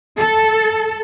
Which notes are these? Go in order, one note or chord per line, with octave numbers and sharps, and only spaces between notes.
A4